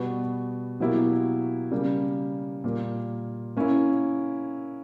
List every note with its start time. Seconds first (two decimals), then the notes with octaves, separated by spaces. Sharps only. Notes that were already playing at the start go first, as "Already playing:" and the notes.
Already playing: B2 G3 B3 F#4 B4
0.80 B2 F#3 A#3 E4 G4
1.71 C#3 G3 A#3
2.64 A#2 G3 A#3
3.57 A#3 C#4 E4